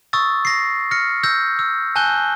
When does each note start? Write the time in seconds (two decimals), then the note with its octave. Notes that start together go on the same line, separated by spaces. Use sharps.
0.13 C#6 D#6 E6 A6
0.45 A#6 C7
0.91 F6 A#6 C#7
1.23 E6 G6 A#6
1.59 E6
1.96 G#5 A5 F#6 G6 G7